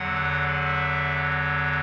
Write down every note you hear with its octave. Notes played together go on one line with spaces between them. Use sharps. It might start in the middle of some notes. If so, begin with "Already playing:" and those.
Already playing: E2 D3 F#3 F#5
E5